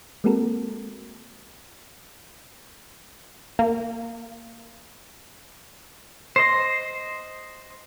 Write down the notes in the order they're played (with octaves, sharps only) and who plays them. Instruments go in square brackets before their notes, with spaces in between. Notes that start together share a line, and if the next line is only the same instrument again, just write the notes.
[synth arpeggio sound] G#3 A#3 C4 F#4 A4 A#4
A#3
[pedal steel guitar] C5 D#5